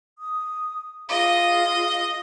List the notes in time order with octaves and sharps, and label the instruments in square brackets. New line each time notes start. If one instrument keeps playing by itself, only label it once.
[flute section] D#6
[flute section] F4 G#4 F5 [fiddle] D#5